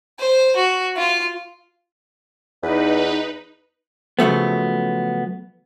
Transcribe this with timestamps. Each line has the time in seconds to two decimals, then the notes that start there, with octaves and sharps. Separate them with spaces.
0.19 C5
0.56 F#4
0.97 F4
2.63 E2 D#4 B4
4.19 C#3 F3 F#3 A3 B3